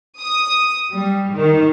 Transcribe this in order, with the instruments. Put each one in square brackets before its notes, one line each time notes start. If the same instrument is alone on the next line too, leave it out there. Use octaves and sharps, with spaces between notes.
[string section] D#6
G3
D#3